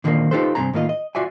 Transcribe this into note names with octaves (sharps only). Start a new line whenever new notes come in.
A#2 D3 D#3 F3 G3 A#3
D#4 F4 G4 A4 B4 C5
G2 C3 D#3 C4 G#5 A#5
A2 D#3 A#3 F4 D#5
D#5
F4 F#4 D5 E5 G#5